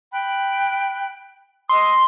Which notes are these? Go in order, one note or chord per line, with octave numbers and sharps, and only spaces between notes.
G5 B5 F#6
D#5 C6 D#6 E6